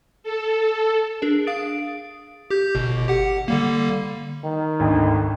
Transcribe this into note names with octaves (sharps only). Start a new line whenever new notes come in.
A4
D4 G#4 A#4
F5 D#6 A6 D7
G4 G6
G1 B2
G4 F#5
D3 G3 A#3
D#3
G#1 D2